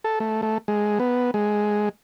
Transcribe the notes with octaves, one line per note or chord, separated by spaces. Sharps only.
A4
A3
A3
G#3
B3
G#3